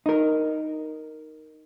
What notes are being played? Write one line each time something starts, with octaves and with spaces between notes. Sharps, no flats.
D#4 A#4